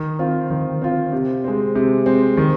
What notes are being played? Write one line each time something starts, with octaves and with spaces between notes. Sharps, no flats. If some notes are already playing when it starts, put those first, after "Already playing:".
Already playing: D#3
C4 F4
D#3
C4 F4
C3
G#3 C4
C3
G#3 C4
D#3